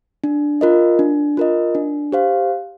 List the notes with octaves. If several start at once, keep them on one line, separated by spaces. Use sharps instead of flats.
D4
F4 A#4 D#5
D4
F4 A#4 D#5
D4
G4 C5 F5